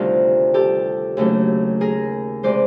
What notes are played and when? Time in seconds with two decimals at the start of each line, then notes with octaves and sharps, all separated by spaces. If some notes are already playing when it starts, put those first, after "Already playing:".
Already playing: D2 C3 D#3 G3 F4
0.54 G4 A4
1.17 D#2 C#3 F#3 A3
1.81 G#4 A#4
2.43 C3 E3 G#3 C5 D5